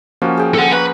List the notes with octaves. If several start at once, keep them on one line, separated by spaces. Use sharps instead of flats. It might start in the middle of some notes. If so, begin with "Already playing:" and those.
F3 A#3 C#4 F#4
G#4 G5 G#5
A4 F#5
B4 F#5 A#5 C#6